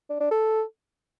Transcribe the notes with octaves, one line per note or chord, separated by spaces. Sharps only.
D4
D4
A4